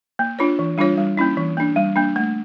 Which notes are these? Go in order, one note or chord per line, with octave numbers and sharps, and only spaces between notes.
A#3
D4 F4 C#5
E3
G3 D4 F4 C#5
G3
A#3 C#4 E4
E3
A#3 D4
G3
A#3 D4
A3